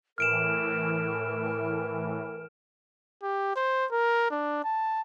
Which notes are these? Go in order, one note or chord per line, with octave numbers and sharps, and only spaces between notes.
A2 E3 A#4 F6 D7 E7
G4
C5
A#4
D4
A5